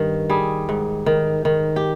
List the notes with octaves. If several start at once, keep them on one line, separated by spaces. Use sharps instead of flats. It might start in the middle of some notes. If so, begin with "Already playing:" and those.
Already playing: G2 D#3
G3 G#4
G#2
D#3
D#3
G4